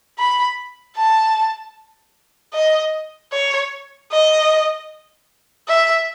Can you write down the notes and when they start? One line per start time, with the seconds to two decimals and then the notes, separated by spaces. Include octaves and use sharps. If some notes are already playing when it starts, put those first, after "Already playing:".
0.19 B5
0.96 A5
2.54 D#5
3.33 C#5
4.12 D#5
5.69 E5